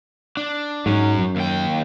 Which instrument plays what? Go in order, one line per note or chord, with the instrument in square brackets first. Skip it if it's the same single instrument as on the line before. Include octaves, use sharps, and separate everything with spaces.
[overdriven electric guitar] D4
[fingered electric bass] G#2 [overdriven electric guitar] F#3 C#4
[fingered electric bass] F#2
[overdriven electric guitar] D#2 G5